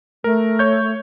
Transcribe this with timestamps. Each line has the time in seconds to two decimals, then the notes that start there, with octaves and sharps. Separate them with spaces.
0.24 A3 A#4
0.59 C#5 G6